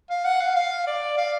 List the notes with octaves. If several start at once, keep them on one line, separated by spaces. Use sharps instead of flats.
F5
F#5
F5
F5
D5
F5